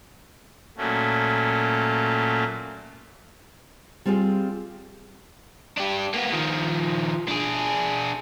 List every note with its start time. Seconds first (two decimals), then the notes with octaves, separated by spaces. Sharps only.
0.77 A#2 F#3 A3 C#4
4.05 G3 C4 F4 G4 G#4
5.78 D4 G4
6.14 A#3 B3
6.32 D#3 F3
7.28 D4 G#4